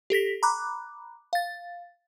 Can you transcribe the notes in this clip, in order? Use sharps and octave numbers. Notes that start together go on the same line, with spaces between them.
G4 A4 A#6 B6
A#5 B5 D6 F#6
F5 A6